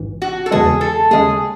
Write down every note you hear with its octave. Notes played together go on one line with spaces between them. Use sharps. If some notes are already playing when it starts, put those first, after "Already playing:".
Already playing: A1 G#2 E3
F#4
A4
E2 C#3 E3 G#3 G#4
A4
D#2 C#3 G#3 C#4 G#4